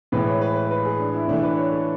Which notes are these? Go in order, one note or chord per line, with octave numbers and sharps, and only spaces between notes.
A2 E3 G#3 B4
C#5
B4
B4
B4
G#4
D4
E4
A2 E3 A3 D4
B4
C#5
A4